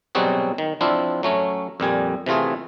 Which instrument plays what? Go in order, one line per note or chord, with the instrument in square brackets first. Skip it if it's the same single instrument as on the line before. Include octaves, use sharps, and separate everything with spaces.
[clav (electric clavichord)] B2 F#3 G3 C4 F#4 G#4
D#3
F3 C4 D4 E4 F4
F#3 A3 C#4
F2 A#2 G3 G#5
C3 E3 A3 F4 G#4